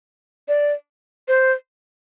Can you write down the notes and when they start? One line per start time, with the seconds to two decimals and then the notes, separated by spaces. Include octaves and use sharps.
0.48 D5
1.28 C5